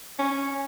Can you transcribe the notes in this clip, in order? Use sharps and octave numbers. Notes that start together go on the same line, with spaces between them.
C#4